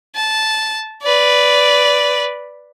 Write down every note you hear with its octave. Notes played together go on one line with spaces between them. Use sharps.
A5
B4 D5